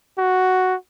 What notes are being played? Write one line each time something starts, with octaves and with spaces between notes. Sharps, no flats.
F#4